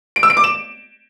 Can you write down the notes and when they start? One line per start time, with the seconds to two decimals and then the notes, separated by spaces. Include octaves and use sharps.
0.16 D7
0.23 E6
0.30 D7
0.37 D6
0.44 E7